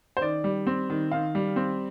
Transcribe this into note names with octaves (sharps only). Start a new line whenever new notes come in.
C5
D#3 D5
G3
C4
D#3
D#3 F5
G3
C4